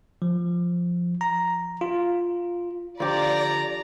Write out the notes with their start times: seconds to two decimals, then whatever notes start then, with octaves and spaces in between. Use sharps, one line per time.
0.22 F3
1.21 A#5
1.81 F4
3.00 D3 F3 G4 D5 A#5